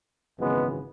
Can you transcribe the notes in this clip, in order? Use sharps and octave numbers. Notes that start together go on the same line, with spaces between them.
G#1 F#2 C#3 E3 G#3 B3